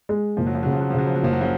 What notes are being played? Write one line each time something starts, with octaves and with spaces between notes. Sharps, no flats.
G#3
F#1 F3
F#3
F3
C#3 F#3
F3
F#3
F3
C#3 F#3
F3
F#3
F#1 F3
F#3
C#3 F3